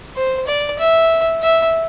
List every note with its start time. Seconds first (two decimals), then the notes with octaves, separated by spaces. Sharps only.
0.16 C5
0.47 D5
0.79 E5
1.42 E5